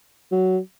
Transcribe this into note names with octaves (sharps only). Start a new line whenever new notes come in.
F#3